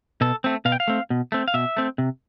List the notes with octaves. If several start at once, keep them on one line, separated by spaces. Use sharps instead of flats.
B2 A4
A3 C4
B2 F5
G5
F5
A3 C4
B2
A3 C4
F5
B2 E5
A3 C4
C3